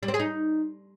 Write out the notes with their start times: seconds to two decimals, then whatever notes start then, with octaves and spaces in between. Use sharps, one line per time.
0.03 G3
0.08 C4
0.14 G#4
0.19 D#4